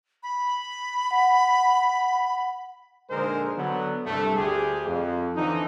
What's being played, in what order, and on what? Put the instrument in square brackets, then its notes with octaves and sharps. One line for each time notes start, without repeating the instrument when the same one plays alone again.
[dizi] B5
[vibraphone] F#5
[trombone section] A#1 D3 G#3 D#4 A#4 C5
D3 F#3 B3
C2 G2 C3 A3
D2 G4 G#4
F2
D3 E3 F3 D#4